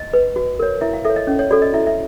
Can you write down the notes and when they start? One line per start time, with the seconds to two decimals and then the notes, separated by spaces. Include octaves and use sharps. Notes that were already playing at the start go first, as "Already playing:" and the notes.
Already playing: D#5
0.13 B4
0.36 F#4
0.59 A#4 C#5
0.81 E4 E5
0.93 F5
1.05 A4 C#5 E5
1.16 D#5
1.27 C#4
1.39 C#5
1.51 F#4 A4 D5
1.62 D#5
1.73 E4 E5
1.87 E5